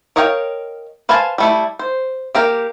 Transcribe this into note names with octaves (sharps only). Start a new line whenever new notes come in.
A#4 C#5 D#5 F5 G5
B4 C5 F5 G#5 A5
G3 A3 E4
C5
A#3 G4 A#4